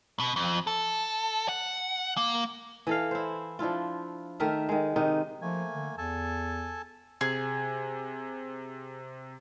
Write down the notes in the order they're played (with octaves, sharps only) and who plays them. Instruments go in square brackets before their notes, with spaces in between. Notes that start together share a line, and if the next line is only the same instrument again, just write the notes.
[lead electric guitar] B2
F2
A4
F#5
A#3
[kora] E3 A4 F5
E4 C5
F3 D4 E4 F4
D#3 A3 A#4 E5
D#3 G#3
C3 D#3 D#4
[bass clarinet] F3 [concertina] A3 A#3 G#5
[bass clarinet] D3
[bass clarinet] E2 [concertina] A4 G#5 A5
[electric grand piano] C3 [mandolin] G#4